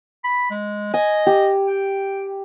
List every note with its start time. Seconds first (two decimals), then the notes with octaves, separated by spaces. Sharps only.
0.24 B5
0.51 G#3
0.94 D#5 G#5
1.27 G4
1.68 G5